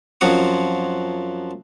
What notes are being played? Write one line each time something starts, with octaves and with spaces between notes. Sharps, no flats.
F#2 F3 F#3 C4 F#5 D#6